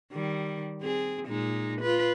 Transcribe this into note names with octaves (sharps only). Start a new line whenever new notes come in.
D#3 G3
C4 G#4
A#2 G#3 D#4
F4 B4